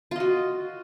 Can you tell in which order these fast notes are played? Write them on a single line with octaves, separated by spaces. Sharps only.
F4 D#5 F#4